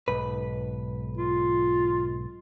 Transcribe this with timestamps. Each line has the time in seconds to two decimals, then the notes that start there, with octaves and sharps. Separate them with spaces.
0.08 B1 G#2 B4
1.17 F4